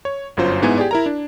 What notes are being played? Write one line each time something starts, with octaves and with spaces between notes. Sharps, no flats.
C#5
G1 F#2 F#3 F4 C5
G#2 B3 E4 G#5 G#6
G4 G#4 D5
E4 A#4 A#5
D4